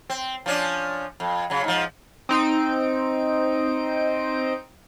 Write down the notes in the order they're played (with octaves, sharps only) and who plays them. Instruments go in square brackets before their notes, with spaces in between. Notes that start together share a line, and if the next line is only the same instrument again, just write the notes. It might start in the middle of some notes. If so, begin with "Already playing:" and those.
[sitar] C4
F3 C#4 D4
F2
C#3 F#3
G#2 F3
[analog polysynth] C4 D#4 D7